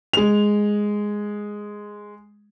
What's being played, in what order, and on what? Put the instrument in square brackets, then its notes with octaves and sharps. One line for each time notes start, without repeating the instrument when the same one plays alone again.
[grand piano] G#3 F7